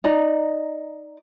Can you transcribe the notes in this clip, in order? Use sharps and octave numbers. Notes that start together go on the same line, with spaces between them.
D#4 D5 D#5 A#5